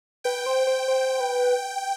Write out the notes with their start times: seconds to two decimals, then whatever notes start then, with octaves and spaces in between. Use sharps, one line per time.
0.24 B4 G5
0.46 C5
0.67 C5
0.88 C5
1.20 B4